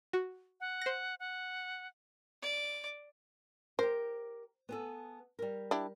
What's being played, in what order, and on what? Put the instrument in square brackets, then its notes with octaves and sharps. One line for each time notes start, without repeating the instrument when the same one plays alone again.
[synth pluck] F#4
[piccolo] F#5
[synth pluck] C5 A#6
[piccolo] F#5
[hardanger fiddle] D5
[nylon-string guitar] G4 A#4 [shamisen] C5
[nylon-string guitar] B3 G#4 A4
G3 A#4
[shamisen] D4 E4 G4